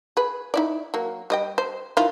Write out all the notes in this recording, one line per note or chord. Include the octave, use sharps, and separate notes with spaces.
G#4 B4
D#4 E4 D5
F#3 A#3
G3 D#5 G5
C5
D#3 E4 F4